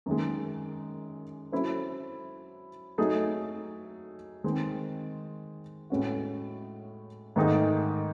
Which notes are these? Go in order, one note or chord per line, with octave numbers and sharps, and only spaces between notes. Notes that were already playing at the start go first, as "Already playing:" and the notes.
F#2 D#3 G#3
F#3 C#4 E4 A4 C5
F#3 A3 D#4 G#4
D#3 G#3 C4
A2 G#3 C#4 F#4
G#2 D#3 A3 D#4 G#4